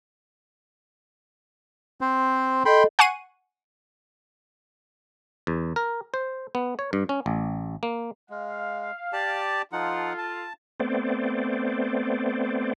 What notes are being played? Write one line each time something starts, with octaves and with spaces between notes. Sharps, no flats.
C4 C5
A4 D#5 G5 B5 C6
F#5 G#5 C#6 C7 D#7
E2
A#4
C5
B3
C#5
G2
C#4
A1
A#3
G#3 F5
G4 D5 A5
F3 D#4 F4 A4 F#5
A5
A3 B3 C4 C5 D5